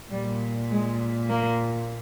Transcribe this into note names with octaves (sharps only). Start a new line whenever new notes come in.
A#2 G3
G#3
A#3